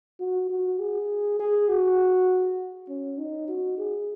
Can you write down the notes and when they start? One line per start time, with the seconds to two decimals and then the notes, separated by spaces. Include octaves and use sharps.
0.20 F#4
0.50 F#4
0.79 G#4
1.39 G#4
1.69 F#4
2.89 C#4
3.18 D#4
3.48 F#4
3.78 G#4